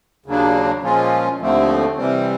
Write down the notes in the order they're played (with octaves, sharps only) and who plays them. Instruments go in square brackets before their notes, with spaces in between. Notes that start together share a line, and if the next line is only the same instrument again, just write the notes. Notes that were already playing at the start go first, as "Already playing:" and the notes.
[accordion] D#2 C#3 F#3 A#3 D4
A#2 F3 G#3 C#4 F4
D#2 D3 F3 A3 C4
C3 E3 G3 C4